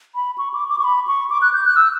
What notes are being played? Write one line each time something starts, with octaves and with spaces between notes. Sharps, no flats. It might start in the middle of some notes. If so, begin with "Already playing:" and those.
B5
C#6
D6
D6
C#6
B5
C#6
D6
F#6
G6
F#6
E6